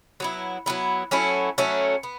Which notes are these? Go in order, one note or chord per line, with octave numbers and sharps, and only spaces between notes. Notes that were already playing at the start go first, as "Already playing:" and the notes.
F#3 B3 E4
F#3 B3 E4
F#3 A3 C#4 E4
F#3 A3 C#4 E4
B3